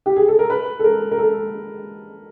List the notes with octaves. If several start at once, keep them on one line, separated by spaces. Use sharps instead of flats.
G4
G#4
A4
A#4
B4
A4
A#4
A#4
A4